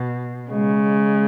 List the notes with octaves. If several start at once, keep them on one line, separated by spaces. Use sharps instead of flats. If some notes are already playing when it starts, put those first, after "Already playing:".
Already playing: B2
C#3 G#3